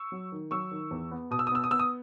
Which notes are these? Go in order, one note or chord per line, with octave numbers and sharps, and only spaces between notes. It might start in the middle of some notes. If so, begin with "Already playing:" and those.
Already playing: C#6 E6
F#3
D#3
F#3 C#6 E6
D#3
E2
B3
B2 D#6
E6
D#6
B3 E6
D#6
B3 E6
D#6